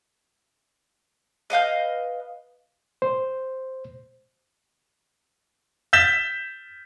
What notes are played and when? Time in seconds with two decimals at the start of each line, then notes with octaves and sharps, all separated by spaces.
1.50 B4 D#5 F5 G6
3.02 C5
5.93 G6 A6 B6 E7 G7